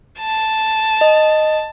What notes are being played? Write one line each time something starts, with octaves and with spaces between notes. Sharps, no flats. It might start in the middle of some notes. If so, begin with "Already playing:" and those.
A5
D#5